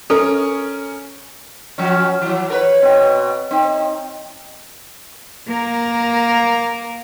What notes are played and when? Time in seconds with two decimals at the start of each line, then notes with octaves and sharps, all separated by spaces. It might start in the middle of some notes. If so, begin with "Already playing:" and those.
0.10 C#4 A4 A#4
1.78 F3 F#3 C#4
2.22 E3 F#3
2.50 A#4 B4 C#5
2.82 B2 C4
3.51 C4 D#4
5.48 A#3 A#4